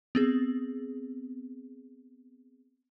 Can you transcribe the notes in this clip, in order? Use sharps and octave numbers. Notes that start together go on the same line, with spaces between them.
B3 C4 G#4